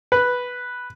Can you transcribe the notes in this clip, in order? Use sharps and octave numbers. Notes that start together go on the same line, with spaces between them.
B4